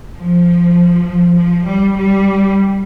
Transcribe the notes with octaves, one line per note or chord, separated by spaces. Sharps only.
F3
F3
G3
G3